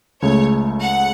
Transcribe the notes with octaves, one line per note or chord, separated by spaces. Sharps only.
C#2 C#3 A3 C#5
F#5